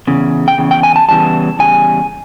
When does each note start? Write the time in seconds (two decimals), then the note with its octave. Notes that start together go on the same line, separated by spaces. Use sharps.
0.07 E2 C#3
0.48 G5
0.58 E2 C#3
0.71 G5
0.83 G#5
0.96 A5
1.09 E2 C#3 E3 G3 A5
1.59 E2 C#3 G3 G#5